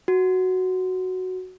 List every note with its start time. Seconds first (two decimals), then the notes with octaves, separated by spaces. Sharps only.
0.08 F#4